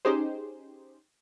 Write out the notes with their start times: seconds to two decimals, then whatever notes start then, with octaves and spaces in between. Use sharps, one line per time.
0.05 C#4 D#4 G4 G#4 C5